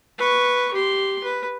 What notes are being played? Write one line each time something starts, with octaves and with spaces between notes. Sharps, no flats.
B4 C#6
G4 C6
B4